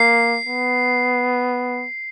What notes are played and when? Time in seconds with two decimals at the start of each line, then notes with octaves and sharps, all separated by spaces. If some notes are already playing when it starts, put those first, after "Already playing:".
Already playing: A#3 C7
0.47 B3